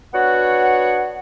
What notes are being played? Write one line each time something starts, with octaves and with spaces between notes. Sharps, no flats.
B3 D4 F#4 C#5 F#5